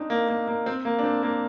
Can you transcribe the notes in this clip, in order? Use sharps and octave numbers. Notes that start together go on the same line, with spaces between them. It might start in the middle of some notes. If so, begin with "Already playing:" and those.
Already playing: C4 D4 D#4
A#3
A#3
A#3
C4
A#3
D4
C4
A#3